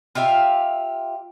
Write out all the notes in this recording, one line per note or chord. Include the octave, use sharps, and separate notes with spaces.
F4 G4 E5 F5